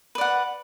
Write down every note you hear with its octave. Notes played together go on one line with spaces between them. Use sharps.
B4 D5 F#5